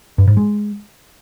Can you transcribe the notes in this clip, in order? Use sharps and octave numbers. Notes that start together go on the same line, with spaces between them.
G2
G#2
G#3